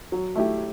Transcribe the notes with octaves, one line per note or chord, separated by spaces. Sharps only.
F#3
A3 E4 G4